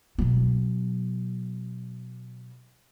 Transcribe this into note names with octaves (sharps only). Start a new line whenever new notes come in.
B2 F#3